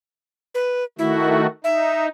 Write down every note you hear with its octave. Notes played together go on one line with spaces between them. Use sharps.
B4
D#3 A3 E4 F#4
D#4 E5